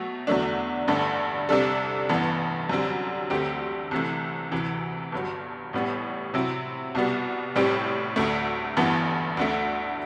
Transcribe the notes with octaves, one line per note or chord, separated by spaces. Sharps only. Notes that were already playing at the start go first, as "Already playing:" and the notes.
Already playing: B2 F#3 A3
E2 D3 F#3 A3 D4
A1 G2 D3 A3 D4
C2 C3 G3 D4 A4
A1 G2 E3 B3
F#2 D3 G3 C4
D2 D3 A3 C4 G4
C2 C3 E3 A3
D2 C3 E3
G1 G2 F#3
A1 A2 G3 B3
C3 F#3 C4 E4
C2 B2 G3 B3
A1 A2 G3 C4 G4
D2 D3 A3
A1 G2 E3 B3
D2 D3 A3